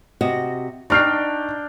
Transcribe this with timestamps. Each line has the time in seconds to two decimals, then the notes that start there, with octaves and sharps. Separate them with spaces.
0.21 C3 F#4 D#5
0.90 D4 D#4 G5 C#6 F6 C7